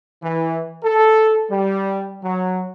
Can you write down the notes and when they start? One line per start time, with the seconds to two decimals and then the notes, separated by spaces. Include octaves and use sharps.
0.22 E3
0.83 A4
1.49 G3
2.23 F#3